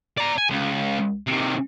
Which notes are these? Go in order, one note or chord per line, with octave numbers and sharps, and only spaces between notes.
D5 A#5
G#5
C#2
C3 D#3